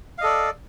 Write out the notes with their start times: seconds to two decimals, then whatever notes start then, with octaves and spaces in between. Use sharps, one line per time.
0.18 F5
0.21 D#5
0.23 A4
0.26 D5